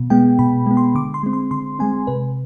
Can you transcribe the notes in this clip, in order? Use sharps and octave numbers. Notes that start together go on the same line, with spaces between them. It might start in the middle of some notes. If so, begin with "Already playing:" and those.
Already playing: B2
G#3 B3 G5
B2 B5
G#3 B3
C6
D3 D6
C6
G#3 C4
C6
D3 C6
G#3 C4 G#5
C3 B4